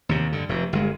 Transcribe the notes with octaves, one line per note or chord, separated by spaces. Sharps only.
D#2 C3
G2 D3
F1 C3
G1 G#3